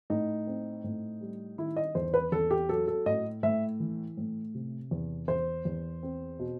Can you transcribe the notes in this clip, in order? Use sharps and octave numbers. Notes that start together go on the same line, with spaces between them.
A2 D#4
C4
A2
G3
D#3 E4
D#5
E2 C5
B4
E2 A4
G4
F#3 A4
A4
A2 D#5
A2 E5
E3
A2
C3
E2
E2 C5
E2
C4
B2